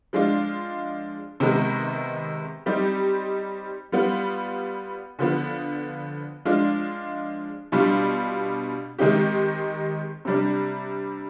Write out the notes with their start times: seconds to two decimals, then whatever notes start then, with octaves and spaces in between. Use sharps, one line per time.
0.13 F3 G#3 D4 F4
1.40 C3 D#3 G#3 B3
2.66 G3 C4 D#4 G4
3.92 G3 B3 F4
5.19 D3 F3 B3
6.45 F3 G#3 D4 F4
7.72 B2 G3 D4 F4
8.98 D#3 G#3 C4 D#4 G4
10.25 C3 G3 D4